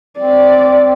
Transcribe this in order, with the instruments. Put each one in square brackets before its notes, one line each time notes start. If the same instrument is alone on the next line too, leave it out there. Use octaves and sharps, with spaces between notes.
[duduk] C4 [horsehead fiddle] D5